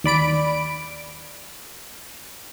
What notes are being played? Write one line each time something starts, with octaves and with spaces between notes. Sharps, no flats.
D#2 D5 B5 D7